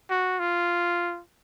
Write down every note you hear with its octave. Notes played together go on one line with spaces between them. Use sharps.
F#4
F4